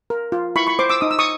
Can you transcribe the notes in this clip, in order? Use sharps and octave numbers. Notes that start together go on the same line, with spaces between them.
A#4
F4
E4 B5 C#6
B5 C#6
C5 C6 D6
D6 E6
D#4 D#6
E6
C#6 D#6